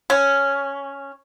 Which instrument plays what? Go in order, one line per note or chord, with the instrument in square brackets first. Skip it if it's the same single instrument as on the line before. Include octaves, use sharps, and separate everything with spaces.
[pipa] C#4